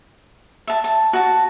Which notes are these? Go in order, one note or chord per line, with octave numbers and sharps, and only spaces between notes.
E5 A5
A5
F#4 A5